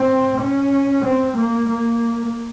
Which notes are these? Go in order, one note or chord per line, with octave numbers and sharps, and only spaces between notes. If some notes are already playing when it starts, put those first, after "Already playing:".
Already playing: C4
C#4
C4
A#3
A#3